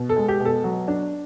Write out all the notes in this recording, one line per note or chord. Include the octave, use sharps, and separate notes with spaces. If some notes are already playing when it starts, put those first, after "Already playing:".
Already playing: B2
A4
G#3
G4
B2
A4
F#3
D4